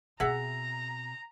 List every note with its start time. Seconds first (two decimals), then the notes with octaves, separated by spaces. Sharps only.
0.20 B2 C4 G#4 E5 F#5 A#5